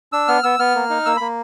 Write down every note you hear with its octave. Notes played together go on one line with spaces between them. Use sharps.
D4 E6
B3 F6
B3 E6
B3 F6
A#3
D#4
A#3 E6
A#3 B5